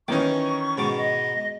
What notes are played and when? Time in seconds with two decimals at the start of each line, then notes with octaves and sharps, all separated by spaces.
0.08 D#3 E3 C#4 D#4 C#6 D6
0.78 G#2 B2 D6
0.97 D#5